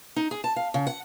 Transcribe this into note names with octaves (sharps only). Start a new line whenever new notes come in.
D#4
G#4
A5
F5
C#3
F#5